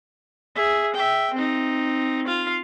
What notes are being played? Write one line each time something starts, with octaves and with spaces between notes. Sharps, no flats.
G#4 E5
E5 G5
C4 D#4
F4 F5